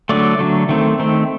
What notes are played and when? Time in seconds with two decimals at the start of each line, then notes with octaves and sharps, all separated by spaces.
0.09 D3 F#3 A3 D5
0.39 D3 F#3 A3
0.69 D#3 A3 C4
1.00 D#3 A3 C4